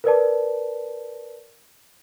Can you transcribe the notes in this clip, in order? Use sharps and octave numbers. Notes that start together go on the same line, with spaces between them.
A#4 B4 D5 A5